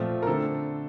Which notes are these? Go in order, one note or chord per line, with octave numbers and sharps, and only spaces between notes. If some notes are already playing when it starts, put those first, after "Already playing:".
Already playing: A#2 F3 A3 C4 F4
A#4
D3 A3 C4 A4